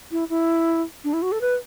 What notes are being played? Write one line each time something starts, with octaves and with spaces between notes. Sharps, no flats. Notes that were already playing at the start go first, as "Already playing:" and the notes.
E4
E4
D4
E4
F#4
A4
B4